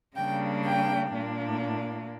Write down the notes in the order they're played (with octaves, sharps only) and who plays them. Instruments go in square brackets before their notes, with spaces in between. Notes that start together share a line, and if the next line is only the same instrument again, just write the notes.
[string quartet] C#3 G3 A#3 D4 G5
G5
A#2 A#3 D4